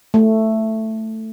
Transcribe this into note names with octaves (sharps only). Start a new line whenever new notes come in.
A3